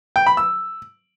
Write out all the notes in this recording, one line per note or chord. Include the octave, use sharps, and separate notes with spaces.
G5
B5
E6